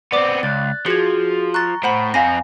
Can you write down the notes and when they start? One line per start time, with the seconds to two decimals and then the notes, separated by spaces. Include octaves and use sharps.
0.12 B3 C4 D5 D6
0.43 C#2 F#6 A6
0.86 F3 F#4 G#4 G#6 C#7
1.54 A#5 C#6 F#6 A6
1.83 A2 C5 F#5 B5
2.14 F2 C4 F5 G#5 A#6